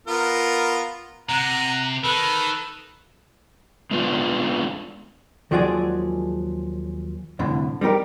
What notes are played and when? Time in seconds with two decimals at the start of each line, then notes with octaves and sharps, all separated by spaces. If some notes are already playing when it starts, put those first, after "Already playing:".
0.07 B3 F4 A#4
1.29 C3 F#5 A#5
2.04 D#3 A4 B4
3.91 G#3 B3 D4 F4
5.51 D#2 F3 F#3 G#3 G#4 D5
7.39 C2 F2 A2 D3
7.81 G3 D#4 G4 A#4